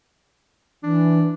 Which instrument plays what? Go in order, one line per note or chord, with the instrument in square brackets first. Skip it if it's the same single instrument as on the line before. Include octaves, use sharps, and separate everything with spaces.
[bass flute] E3 [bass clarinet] D4